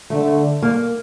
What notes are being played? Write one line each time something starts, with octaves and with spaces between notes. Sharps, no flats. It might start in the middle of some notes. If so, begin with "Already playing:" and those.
D3 A3
A#3